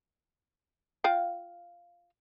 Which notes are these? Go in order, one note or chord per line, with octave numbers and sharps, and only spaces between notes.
F4 F5 G5